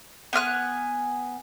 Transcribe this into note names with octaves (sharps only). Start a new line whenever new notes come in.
B3 G#5 F6 F#6